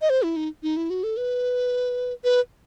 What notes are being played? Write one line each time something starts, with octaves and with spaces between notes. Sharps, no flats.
D#5
C5
E4
D#4
D#4
E4
F#4
A4
B4
B4